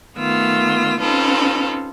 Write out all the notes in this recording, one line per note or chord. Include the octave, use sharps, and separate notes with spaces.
D#3 A3 B3 F4 E6
C4 C#4 D#4 F4 A4 B4